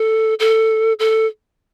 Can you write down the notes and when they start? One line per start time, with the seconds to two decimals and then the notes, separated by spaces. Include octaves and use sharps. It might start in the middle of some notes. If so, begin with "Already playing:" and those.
Already playing: A4
0.40 A4
0.99 A4